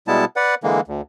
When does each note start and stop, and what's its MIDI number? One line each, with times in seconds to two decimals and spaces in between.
0.08 0.25 47
0.08 0.25 55
0.08 0.25 56
0.08 0.25 59
0.08 0.25 64
0.08 0.25 81
0.36 0.55 71
0.36 0.55 74
0.36 0.55 78
0.63 0.81 50
0.63 0.81 52
0.63 0.81 56
0.63 0.81 58
0.88 1.01 38